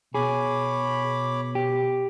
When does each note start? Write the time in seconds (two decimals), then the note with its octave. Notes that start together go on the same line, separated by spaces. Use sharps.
0.15 B2 G#4 C#5 B5 D6
1.55 G4